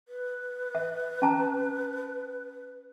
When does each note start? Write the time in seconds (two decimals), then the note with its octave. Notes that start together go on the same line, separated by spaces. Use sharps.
0.08 B4
0.75 E5
1.22 C#4 A5 A#5